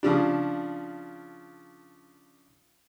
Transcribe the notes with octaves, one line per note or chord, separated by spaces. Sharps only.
C#3 F3 D4